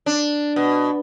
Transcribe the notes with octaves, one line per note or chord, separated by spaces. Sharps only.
D4
B2